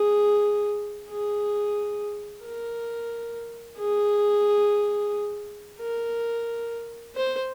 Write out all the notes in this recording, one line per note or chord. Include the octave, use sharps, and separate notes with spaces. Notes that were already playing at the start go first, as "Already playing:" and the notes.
Already playing: G#4
G#4
A#4
G#4
A#4
C5